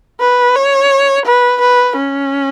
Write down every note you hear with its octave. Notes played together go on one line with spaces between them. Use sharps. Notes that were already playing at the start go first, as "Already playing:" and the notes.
B4
C#5
B4
B4
C#4